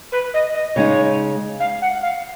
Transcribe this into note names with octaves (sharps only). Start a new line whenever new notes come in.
B4
D#5
D#5
C#3 G#3 D#4 C#5
F5
F#5
F5